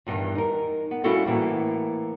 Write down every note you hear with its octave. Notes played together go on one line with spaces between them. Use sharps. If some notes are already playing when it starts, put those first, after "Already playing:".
E2 G2 B2 D#3 E3
D#4 A#4
B3
G3 C#4 E4 F#4 A4 F5
A2 E3 A#3